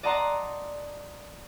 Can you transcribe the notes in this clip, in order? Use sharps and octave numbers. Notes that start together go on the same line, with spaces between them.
D5 D#5 F#5 A5 A#5 C6